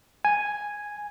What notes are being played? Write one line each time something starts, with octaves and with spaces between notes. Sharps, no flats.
G#5